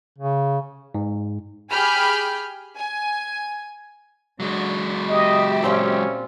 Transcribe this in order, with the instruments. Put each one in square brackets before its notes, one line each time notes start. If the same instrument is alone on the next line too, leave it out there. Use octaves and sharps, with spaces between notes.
[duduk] C#3
[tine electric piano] G#2
[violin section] G4 G#4 G#5 B5 F6 G6
G#5
[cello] D3 [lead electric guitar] F#3 G#3
[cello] G4 E5 [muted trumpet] D#5
[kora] A#2 C4 F4 [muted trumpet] C#4